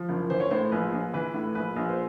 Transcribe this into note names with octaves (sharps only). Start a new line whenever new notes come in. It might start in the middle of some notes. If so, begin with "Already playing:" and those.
Already playing: F3
F#1
E3 C5
C#5
A2 C5
A#1 B4
A#1
E3 B4
A2
A#1 B4
A#1
C5